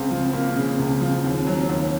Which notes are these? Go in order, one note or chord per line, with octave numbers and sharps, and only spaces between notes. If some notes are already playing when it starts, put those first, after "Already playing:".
Already playing: C#2 C4
F3
A#3
C#3
C#2
F3
D#2
F#3
D#2